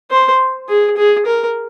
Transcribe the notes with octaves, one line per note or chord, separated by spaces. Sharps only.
C5
G#4
G#4
A#4